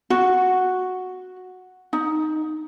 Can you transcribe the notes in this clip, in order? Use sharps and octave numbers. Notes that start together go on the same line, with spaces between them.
F#4
D#4